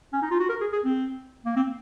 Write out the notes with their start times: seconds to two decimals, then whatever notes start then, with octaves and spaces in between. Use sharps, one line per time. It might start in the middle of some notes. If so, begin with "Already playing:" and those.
0.13 C#4
0.22 D#4
0.31 F4
0.40 F#4
0.49 A#4
0.60 G#4
0.72 G#4
0.84 C4
1.45 A#3
1.56 C4